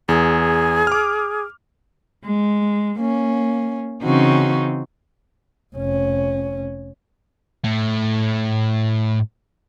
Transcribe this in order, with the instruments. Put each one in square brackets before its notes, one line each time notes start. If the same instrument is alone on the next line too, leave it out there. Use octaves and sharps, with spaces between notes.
[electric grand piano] E2 [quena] G#4
[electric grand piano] D6 F6
[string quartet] G#3
A#3 C#4
C#3 E3 C4 C#4 D#4 F#4
[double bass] F1 C#4
[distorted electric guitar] A2 A3